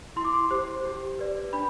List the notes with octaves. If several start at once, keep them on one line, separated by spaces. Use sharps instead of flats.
E4 C6
D6
C6
G4 C5
G4
B4 D5
D4 B5